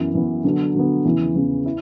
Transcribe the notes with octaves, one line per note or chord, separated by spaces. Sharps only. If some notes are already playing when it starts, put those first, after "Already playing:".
Already playing: F#2 E3 B3 E4
F#2 E3 B3 E4
D3 F#3 B3
D3 F#3 B3
E2 C#3 E3
E2 C#3 E3
E4